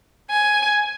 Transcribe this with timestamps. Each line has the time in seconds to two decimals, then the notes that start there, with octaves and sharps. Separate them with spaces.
0.30 G#5